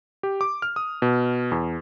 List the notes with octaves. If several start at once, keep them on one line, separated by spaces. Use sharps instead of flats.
G4
D6
F6
D#6
B2
E2